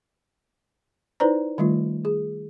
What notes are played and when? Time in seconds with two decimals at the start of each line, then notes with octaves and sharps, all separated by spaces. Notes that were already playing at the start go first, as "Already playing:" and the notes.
1.20 D#4 E4 B4 C5 D5 A#5
1.58 D#3 G3 A3 F4
2.05 G#4